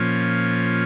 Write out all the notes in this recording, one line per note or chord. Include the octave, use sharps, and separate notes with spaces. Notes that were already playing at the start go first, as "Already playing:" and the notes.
Already playing: A#2 F3 C#4